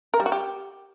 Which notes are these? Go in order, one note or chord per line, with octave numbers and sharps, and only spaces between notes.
A#4
G3
F#4
G4